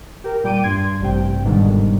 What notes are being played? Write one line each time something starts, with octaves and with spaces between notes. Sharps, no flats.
G4 A#4
A#2 G3 G5 D6 D7 D#7
G2 C6 G#6
A1 G2 C3 G5
G1 G#2 B2 D3 D#3 G3